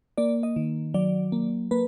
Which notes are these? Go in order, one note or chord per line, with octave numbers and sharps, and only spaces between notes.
A#3 D5
D#5
D#3
F#3 D5
A#3
A#3 B4